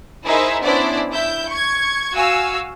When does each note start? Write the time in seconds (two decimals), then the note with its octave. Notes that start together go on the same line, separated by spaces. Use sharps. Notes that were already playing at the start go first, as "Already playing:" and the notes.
0.24 D#4 E4 G#4 A#4 C5 E5
0.62 B3 C#4 D4 E4 C5 D5
1.10 E4 E5 G6
1.48 C#6 G#6
2.14 F#4 F5 G#5 E6